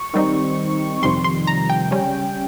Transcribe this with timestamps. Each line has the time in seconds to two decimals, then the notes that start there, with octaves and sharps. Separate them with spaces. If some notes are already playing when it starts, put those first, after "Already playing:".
Already playing: C#6
0.14 D#3 G3 C4 D#4
1.02 F2 C3 D#3 G3 C6
1.24 C6
1.47 A#5
1.70 G5
1.91 C#3 G3 C#4